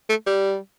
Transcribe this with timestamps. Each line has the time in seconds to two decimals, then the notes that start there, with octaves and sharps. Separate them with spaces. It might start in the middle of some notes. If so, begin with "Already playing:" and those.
0.10 A3
0.27 G3